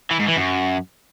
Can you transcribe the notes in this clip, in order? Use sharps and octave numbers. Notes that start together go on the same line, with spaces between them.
E3
G#2
E3
F#2